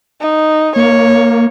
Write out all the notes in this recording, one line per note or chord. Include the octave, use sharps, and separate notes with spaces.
D#4
A#3 C#5